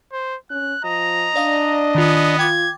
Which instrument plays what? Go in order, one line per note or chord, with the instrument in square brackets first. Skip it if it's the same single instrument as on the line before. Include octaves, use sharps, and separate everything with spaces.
[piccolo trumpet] C5
[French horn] C#4 [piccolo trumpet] F#6
[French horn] F3 [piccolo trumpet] D#5 [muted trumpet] A#5
[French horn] D4 [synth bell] D5 F5 D#6
[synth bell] D#3 F4 [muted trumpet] B3
[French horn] F4 [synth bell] G5 D6 A6 [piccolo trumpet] G#6